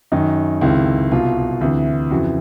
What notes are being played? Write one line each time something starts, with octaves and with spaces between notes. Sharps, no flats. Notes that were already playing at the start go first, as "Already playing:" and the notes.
F#2 D#3 D#4
C#2 C3 D#3 E4
C2 B2 F4
D2 C3 E3
F2 C#3 E3 F#4